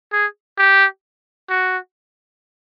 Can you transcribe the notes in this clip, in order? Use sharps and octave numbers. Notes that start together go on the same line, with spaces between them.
G#4
G4
F#4